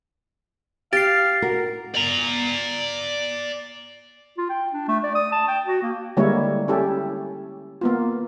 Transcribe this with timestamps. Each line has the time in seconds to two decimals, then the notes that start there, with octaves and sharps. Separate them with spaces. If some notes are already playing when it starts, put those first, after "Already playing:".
0.93 G4 F5 A6 C7
1.42 F#4 A#4
1.95 D5 A#5
4.38 F4
4.50 G5
4.73 D4
4.88 A3
5.04 D5
5.15 D#6
5.32 A5
5.48 G5
5.66 F#4
5.83 A#3
6.17 D3 G3 G#3 A#3 E4 C#5
6.68 C#4 E4 G4 A4
7.81 A#3 B3 F4